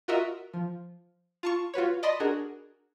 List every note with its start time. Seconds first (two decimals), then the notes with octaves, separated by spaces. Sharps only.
0.08 F4 F#4 A#4 D#5 E5
0.53 F3
1.43 F4 A5 C#6
1.74 F4 F#4 B4 C#5
2.03 D5 D#5 A5 B5 C6
2.20 D4 F#4 G#4 A#4